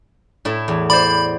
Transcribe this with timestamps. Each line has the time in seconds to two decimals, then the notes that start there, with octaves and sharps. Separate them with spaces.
0.45 A2 E4
0.68 E2
0.90 C5 D5 B5